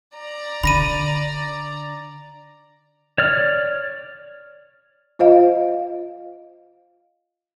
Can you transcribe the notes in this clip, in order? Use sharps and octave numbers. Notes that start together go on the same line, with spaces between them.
D5 A#5
D3 B5 A#6 D#7
C#5 D5 F6
F4 C5 D#5 F5